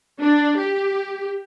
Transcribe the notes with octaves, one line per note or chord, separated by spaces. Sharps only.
D4
G4